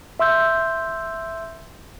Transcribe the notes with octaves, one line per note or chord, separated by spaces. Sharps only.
E5 C6 E6 G6